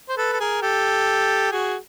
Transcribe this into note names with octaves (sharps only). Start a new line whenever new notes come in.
C5
A4 B4
A4
G#4 A#4
G4 A4
F#4 G#4